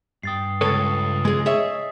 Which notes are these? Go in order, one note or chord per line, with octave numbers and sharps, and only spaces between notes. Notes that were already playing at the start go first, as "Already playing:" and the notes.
G2 G5 D#6 A6 C7
C#2 A4 B4 C#5 D#6 A6
G#3 G#4
G#4 C#5 D#5 E5 B6